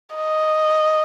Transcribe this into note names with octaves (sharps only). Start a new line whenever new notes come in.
D#5